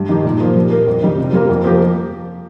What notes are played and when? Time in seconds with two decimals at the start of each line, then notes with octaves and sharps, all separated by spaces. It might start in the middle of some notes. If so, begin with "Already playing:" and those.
Already playing: G2
0.09 D#3 G3 D#4 G4
0.24 A#2
0.41 F3 A#3
0.56 G3
0.72 A#3 G4 A#4
0.87 F2
1.02 D#3 G3 D#4
1.18 C3
1.33 G3 A#3 F4 A#4
1.49 F2
1.64 F3 A#3 G4 A#4